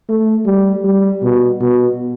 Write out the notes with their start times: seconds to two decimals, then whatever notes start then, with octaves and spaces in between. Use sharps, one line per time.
0.09 A3
0.46 G3
0.84 G3
1.23 B2
1.60 B2